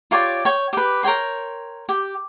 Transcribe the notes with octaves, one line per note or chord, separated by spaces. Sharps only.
F4 G4 C#5 D5
C#5 G5
G4 B4
A#4 C#5 G5 C6
G4